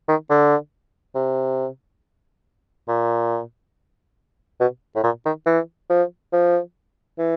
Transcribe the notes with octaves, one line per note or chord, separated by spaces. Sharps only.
D#3
D3
C3
A#2
B2
A2
A#2
D#3
E3
F3
F3
E3